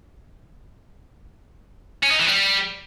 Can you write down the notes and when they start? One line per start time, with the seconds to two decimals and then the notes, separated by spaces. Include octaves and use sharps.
2.03 C#4
2.11 D#4
2.19 E3
2.27 G3